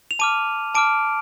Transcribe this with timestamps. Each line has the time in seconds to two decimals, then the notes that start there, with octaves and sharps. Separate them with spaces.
0.11 F7
0.19 A5 D6 F6 D#7
0.75 A5 D6 F6 D7